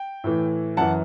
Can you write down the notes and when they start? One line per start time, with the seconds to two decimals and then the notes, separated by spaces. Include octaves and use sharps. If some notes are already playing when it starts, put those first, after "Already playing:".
Already playing: G5
0.24 A2 E3
0.77 F#2 E3 F#5 A5